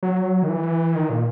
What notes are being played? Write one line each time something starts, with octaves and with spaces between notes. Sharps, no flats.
F#3
D#3
E3
D#3
A#2